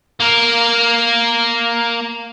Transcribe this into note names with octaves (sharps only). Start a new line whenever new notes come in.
A#3 A#4